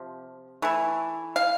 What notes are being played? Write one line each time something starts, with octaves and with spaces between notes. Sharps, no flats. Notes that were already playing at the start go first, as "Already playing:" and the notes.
Already playing: C3 F3
E3 A3 E4
F5